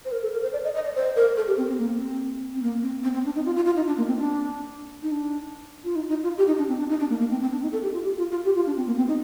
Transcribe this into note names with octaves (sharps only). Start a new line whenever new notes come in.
C5
A#4
A4
A#4
C5
D5
D#5
D#5
D5
C5
A#4
A4
G4
C4
C4
A#3
C4
C4
A#3
C4
C4
C4
D4
D#4
F4
F4
F4
D#4
D4
A#3
C4
D4
D#4
D4
F4
D#4
D#4
F4
G4
D#4
D4
C4
D4
D#4
D4
A#3
A#3
C4
C4
D4
D#4
A4
G4
F4
G4
F4
F4
G4
F4
D4
C4
A#3
C4
D#4